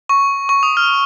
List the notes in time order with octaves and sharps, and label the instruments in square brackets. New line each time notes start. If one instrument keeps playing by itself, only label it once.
[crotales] C#6
C#6
D#6
F6